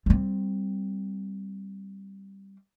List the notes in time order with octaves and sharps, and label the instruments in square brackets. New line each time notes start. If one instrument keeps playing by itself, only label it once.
[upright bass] G3 C4